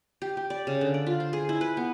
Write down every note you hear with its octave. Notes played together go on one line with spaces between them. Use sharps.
G4
G4
D5
C#3
D3
D5
F4
C5
G#4
E4
B4
B3